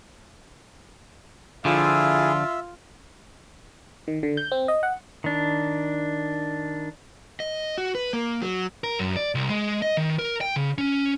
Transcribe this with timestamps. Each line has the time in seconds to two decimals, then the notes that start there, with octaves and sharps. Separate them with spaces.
1.65 D3 F3 E4 F4 G#4 E5
4.08 D#3
4.23 D3
4.37 G6
4.52 C4
4.68 D#5
4.83 F#5
5.24 D#3 D4
7.40 D#5
7.78 F#4
7.95 B4
8.13 A#3
8.42 F#3
8.84 A#4
8.99 F#2
9.17 D5
9.35 C2
9.49 G#3
9.82 D#5
9.97 D#3
10.19 A#4
10.41 G5
10.56 C#3
10.78 C#4